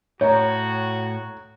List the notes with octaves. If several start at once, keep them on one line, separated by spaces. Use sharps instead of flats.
A2 F#4 C#5 A#5 G6